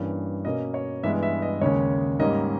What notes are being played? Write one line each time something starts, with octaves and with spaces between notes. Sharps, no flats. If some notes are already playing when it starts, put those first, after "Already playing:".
Already playing: G2 E3 A#3 C#4
B2 A#3 C#4 D#5
C#5
G2 E3 G#3 B3 E5
E5
D#5
D#2 C#3 G#3 C#4 C#5
G#2 G3 A#3 C#4 D#5